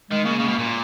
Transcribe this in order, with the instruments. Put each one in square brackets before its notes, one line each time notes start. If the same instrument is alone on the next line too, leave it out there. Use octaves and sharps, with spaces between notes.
[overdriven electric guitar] D#3 [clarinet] G#3
[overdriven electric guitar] C#3 [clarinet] A#3
[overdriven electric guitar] C#3
B2
A#2